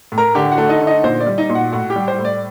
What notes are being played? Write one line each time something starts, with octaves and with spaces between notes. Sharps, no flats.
A2
A#4 A#5
D3 G4 G5
F#4 F#5
A3
D#4 D#5
D3
D#4 D#5
A#2 C5
D5
G3
D#4 D#5
A#2
F#4 F#5
A2 F#4 F#5
G4 G5
G3
C5
A2
D5